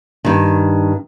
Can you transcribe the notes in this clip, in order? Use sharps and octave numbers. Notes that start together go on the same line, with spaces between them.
G2 D#3